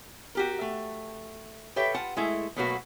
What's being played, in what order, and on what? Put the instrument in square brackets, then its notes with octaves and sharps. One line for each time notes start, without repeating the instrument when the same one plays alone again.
[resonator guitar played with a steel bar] F#4 G4 A#4
A3
G4 A4 B4 C#5 E5 G5
F4 F#5 A5
G#3 A3 E4
B2 F#3 A3 A#3 F#4 B4